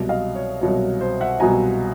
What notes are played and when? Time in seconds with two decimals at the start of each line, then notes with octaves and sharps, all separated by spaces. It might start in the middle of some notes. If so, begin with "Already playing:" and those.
Already playing: C2 B2 F#3
0.09 D#5 F5
0.35 C#5
0.61 C2 B2 F#3 C#5
1.01 C5
1.21 E5 F#5
1.40 C2 B2 F#3 G#5 A#5